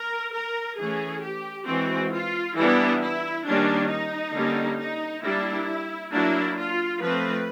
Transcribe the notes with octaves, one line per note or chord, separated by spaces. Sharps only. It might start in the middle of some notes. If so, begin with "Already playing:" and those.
Already playing: A#4
A#4
E3 A3 C#4 G#4
G4
E3 G#3 C4 F#4
F4
E3 G3 B3 D4 E4
E4
D#3 G3 A#3 C#4 D4
D#4
D3 G3 A#3 C#4
D#4
G3 A#3 D4 E4
F#3 A#3 D4 E4
F4
F3 A3 C4 B4